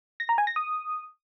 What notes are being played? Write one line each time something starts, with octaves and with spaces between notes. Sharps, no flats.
A#6
A#5
G#5
A#6
D#6